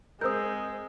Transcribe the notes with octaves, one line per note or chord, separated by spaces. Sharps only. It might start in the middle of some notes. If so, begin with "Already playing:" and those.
G#3 C4 A#4 D#6 E6 G6